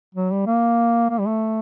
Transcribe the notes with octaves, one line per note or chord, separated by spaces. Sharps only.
F#3
G3
A#3
A#3
G3
A3